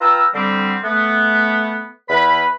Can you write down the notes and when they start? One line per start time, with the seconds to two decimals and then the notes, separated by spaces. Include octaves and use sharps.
0.01 F4 B4 G5 A#5 E6
0.34 D3 G3 C4
0.84 A3 B3
2.09 E2 B4 B5